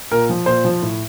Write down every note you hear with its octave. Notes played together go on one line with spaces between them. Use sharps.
A#2 A#4
F3
A#2 C5
F3
A2